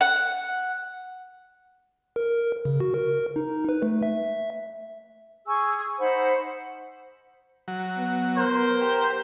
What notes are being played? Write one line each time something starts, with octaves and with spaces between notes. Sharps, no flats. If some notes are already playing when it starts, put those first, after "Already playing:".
F#5
A#4
C#3
F#4
A#4
D#4
B4
A3
E5
G#4 G#5 C#6 E6
D#4 C5 F#5 B5
F#3
B3
A#4 C5
G4